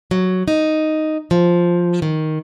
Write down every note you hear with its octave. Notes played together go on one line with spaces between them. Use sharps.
F#3
D#4
F3
D#3